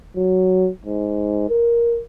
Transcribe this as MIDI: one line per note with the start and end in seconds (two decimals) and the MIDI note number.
0.16 0.68 54
0.85 1.47 44
1.50 2.01 70